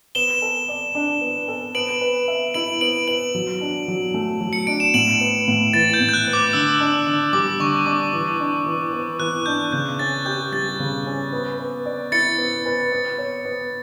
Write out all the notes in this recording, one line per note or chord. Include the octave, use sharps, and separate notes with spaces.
B3 E7 G7
A4
D5
D4
B3
A4
B3 D7 F#7
B4
E5
E4 D7 F#7
B3 D7 F#7
B4 D7 F#7
F#3
D4
F#3
A3
F#3
C#7
D4 D7
E7
A2 D7 F#7
B3
A2
E3 A6
G6
A2
G6
F#6
B3
D6
D3 E6
D4
D3
G3 D6
D3 C#6
D4 D6
E3
D4
E3
B3
E3 F#6
D4 G6
C#3 G6
C#4 A6
G4 G6
G3 A6
C#3
C#4
B3
B4
D5
E4 A6 C#7
B3
B4
B3
C#5
B3